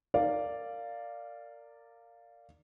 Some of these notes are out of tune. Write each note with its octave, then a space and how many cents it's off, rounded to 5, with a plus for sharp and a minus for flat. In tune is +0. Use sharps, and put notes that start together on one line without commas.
A#4 -25 D5 +0 F5 +0